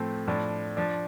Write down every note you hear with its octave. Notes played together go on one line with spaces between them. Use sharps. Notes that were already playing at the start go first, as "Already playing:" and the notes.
Already playing: A2 F3 A3 C4
A2 F3 D4
F3 D4